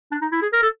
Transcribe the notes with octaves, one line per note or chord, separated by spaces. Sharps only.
D4
D#4
E4
G#4
A#4
A4